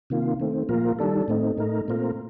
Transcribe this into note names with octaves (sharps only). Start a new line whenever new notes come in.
C3 D#3 A#3 F4
D#3 A3 C4
A#2 F3 A#3 F4 A#4
D#3 G3 D4 A4
A2 A3 C4 D#4
A2 A3 D#4 A#4
A#2 A3 C4 F4 A#4